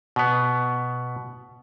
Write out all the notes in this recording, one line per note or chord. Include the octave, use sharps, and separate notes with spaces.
B2 B3